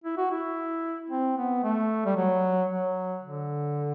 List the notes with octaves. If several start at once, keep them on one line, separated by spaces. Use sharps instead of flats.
E4
F#4
E4
C4
B3
A3
G3
F#3
F#3
D3